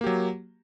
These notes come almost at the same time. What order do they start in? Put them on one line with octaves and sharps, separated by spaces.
A#3 G4 F#3